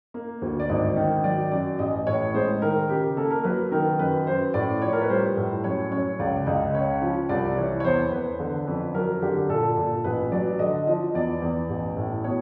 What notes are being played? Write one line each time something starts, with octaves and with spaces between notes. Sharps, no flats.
A#3
D2
D5
G#1 D#5
D#3
F#3 D5
F#2 D5
A1 D#5
A2 C#5
G#3 C5
D#3 A#4
C#3 G4
A#3 A4
A#4
F#3 B4
D#3 A#4
F#2 B4
F#2 C5
A2 D5
F3 C#5
A#4
B4
G3 C5
A2
F#2 C#5
F#2 C#5
C#2 D5
C#2 D#5
C#3 C#5
F3
C2 D5
E3 C#5
C#5
E2 C5
E2 B4
D3
F2
F#3 A#4
D3 G4
A#2 A4
A#2
A1 B4
F#3 D5
D3 D#5
F3 D#5
E2 D5
E2
A1
A2
B2 C#5